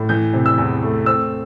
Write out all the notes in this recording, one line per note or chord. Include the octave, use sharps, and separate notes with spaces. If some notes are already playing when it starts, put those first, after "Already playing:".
Already playing: A2
E3 G6
C3
E6
E2
A3
C4 E6